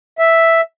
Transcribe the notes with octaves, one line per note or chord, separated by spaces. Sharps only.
E5